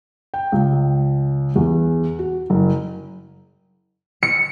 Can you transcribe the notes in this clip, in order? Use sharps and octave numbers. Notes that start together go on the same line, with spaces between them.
G5
C#2
E2
F#4
F#1
C#7